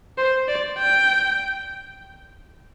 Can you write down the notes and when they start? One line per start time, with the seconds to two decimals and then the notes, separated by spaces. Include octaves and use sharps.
0.18 C5
0.48 D5
0.78 G5